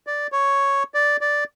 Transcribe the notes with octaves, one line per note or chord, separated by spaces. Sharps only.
D5
C#5
D5
D5